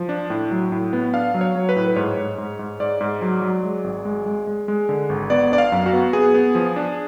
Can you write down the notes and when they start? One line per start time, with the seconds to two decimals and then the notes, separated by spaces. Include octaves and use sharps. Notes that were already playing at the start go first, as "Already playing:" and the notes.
Already playing: F3
0.09 D4
0.30 A2
0.51 F#3
0.72 A2
0.93 B3
1.13 D4 F5
1.34 F#3
1.41 C#5
1.55 F#3
1.69 B4
1.76 A2
1.87 B4
1.96 G#2 C#5
2.17 G#2
2.38 G#2
2.59 G#2
2.80 G#2 D5
3.01 G#2
3.22 F#3
3.42 F#3
3.63 G#3
3.84 G#1
4.05 G#3
4.26 G#3
4.47 G#3
4.68 G#3
4.89 D3
5.09 G#1
5.30 B3 D5
5.52 D4 D5
5.58 F5
5.72 F#2
5.86 F#4
5.93 B3
6.13 B3 G#4
6.34 B3
6.55 F3
6.76 D4